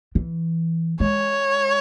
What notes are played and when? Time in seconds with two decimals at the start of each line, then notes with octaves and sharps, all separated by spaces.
0.15 E3
1.00 G#3 C#5